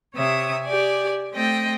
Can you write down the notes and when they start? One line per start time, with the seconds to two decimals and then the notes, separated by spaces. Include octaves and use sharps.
0.14 C3 C#5 E5 D#6
0.65 G4 D5 G#5
1.32 A3 C4 D#5 G5